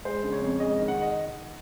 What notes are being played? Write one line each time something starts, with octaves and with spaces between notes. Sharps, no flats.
G#3 C5
C#3
C#5
F2
G#3 D#5
D#3
F#5
D#5